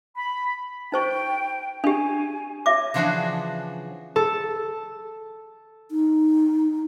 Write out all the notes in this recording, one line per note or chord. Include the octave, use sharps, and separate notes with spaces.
B5
D#4 C5 G5 C#6
D4 G4 G#5
C#5 E5 D6
C#3 E3 F3 D4 F#4 G#4
A4
D#4